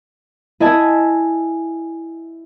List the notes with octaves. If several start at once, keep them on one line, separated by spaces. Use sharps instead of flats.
E4 D#5 E5 G#5 A5 D#6